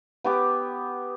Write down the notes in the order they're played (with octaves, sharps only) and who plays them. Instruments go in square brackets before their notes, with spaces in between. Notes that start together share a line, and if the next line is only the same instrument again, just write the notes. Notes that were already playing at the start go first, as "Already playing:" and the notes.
[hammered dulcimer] B3 G4 D6